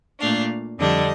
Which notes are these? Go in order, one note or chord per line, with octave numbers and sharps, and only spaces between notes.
A#2 A3 D4 F5
F2 D3 G3 D4 D#5